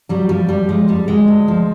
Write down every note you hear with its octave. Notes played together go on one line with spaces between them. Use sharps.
F#3 G3
F3 G3
F2 G3
F3 G#3
F2 G3
D2 G#3
D2
F3